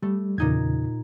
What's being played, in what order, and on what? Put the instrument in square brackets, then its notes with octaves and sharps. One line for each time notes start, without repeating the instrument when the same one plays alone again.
[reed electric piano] G3 [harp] A3
[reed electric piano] E2 C#3 [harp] A#2 D#4 G#6